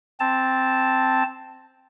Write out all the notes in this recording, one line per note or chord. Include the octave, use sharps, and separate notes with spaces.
C4 A5